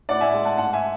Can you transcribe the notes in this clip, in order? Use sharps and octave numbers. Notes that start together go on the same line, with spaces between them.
A2 D5 F#5
E5 G#5
G#3
F#5 A5
G#2 F#5 A5
E5 G#5